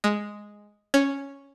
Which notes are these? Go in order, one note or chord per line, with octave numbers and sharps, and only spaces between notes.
G#3
C#4